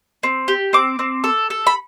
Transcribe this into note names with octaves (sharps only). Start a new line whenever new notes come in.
C4
G4
C4 D6
C4
A4
A4
B5